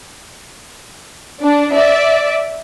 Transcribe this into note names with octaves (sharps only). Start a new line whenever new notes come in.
D4
D5 E5